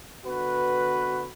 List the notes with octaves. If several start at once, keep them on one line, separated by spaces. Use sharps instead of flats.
D3 B3 F#4 B4